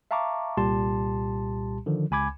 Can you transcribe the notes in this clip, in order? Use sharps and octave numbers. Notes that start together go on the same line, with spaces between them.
E5 F5 A5 A#5 C#6 D6
C2 A#2 G3 G4 A5 C6
D3 D#3 F3
C#2 G#5 B5 D6 G#6